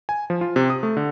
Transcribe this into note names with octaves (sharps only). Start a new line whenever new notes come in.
G#5
F3
F4
C3
D#6
A3
D3